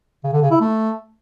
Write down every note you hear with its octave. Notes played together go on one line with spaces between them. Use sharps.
C#3
D3
C#3
E4
A3